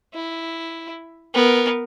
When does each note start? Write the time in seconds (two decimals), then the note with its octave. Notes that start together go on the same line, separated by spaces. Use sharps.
0.14 E4
1.34 B3 A#4